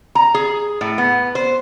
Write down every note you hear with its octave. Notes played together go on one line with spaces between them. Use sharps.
A#5
G#4
A2
B3
C5